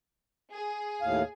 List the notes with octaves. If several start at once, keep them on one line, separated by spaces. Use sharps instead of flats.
G#4
D#2 A2 F5